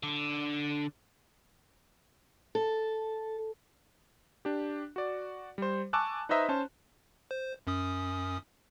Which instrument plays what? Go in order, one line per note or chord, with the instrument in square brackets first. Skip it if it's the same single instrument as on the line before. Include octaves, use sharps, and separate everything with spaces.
[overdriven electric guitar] D3
[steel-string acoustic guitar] A4
[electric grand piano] D4 G4
F#4 D5
G3 C5
G#5 A5 C#6 D6 E6 F#6
D#4 B4 C5 D#5 E5 A#5
C#4 C5 A5
[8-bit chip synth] C5
F#2 C#4 D#6